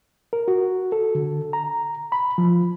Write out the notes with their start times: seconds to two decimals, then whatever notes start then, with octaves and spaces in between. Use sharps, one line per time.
0.33 A#4
0.48 F#4
0.92 A4
1.15 D3
1.53 A#5
2.12 B5
2.38 F3